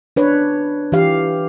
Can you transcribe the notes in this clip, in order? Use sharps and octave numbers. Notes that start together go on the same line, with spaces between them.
D4 B4 C#5
E3 G4 F5